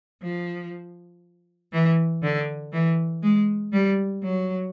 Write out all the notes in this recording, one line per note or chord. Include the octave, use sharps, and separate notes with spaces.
F3
E3
D3
E3
G#3
G3
F#3